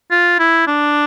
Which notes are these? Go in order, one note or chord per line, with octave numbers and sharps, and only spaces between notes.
F4
E4
D4